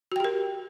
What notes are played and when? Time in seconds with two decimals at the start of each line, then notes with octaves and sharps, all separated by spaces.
0.12 F#4
0.16 G5
0.20 G4
0.24 A#4